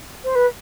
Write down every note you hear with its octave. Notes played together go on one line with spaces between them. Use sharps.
C5
B4